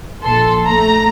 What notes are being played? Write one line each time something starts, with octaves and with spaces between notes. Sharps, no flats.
A#1 A4 C6
A3 A#5